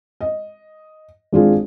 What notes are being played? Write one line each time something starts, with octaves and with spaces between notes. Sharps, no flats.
D#5
G#1 D4 F4 G#4